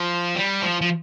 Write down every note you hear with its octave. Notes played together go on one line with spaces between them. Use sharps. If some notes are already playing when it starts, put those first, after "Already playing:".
Already playing: F3
G3
F3
F3